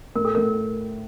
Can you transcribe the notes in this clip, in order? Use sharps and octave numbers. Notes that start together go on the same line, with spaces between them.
A2 A#4
A4
A2 A#4